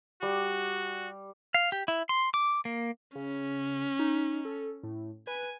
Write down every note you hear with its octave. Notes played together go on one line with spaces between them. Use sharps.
G3 F#4
F5
G4
E4
C6
D6
A#3
C#3 C#4
D#4
A4
A2
B4 G#5